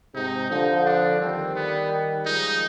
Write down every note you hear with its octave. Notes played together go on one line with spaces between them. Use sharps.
G#2 C3 D#4
D3 F3 D#4
D4
D#3 G3 C4
B3
F3 G#3 D#4